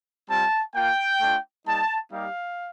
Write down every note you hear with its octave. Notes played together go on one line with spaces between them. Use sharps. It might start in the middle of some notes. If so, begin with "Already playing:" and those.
G3 C4 F4 A5
A#3 F4 G5
A3 D4 F4
G3 A#3 D#4 A5
G3 A#3 D#4 G4 F5